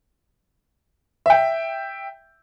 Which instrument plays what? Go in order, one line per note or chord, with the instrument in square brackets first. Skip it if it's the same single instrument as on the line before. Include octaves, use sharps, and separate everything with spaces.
[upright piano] E5 G5